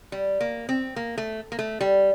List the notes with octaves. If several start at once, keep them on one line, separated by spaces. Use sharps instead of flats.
G3
A#3
C4
A#3
A3
A#3
A3
G3